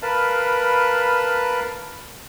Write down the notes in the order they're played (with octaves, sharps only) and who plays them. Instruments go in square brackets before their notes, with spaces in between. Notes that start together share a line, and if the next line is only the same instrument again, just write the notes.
[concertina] A#4 B4 F5 A5 B5